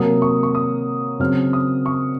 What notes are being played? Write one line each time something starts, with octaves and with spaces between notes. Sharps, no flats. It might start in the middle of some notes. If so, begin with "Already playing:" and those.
Already playing: C3 F#3 A#3 D#6
C#6
C#6
D#6
C#3 F#3 C4 F6
D#6
C#6